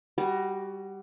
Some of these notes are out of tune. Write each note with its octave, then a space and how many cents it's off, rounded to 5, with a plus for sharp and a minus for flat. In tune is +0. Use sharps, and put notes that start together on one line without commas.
G3 +0 F#4 +20